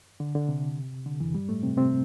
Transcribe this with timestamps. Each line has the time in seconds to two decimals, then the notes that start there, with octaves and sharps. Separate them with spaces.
0.20 D3
0.35 D3
0.49 C3
1.06 D3
1.20 E2 E3
1.34 G2 G3
1.49 A2 A3
1.63 C3 C4
1.77 C3 C4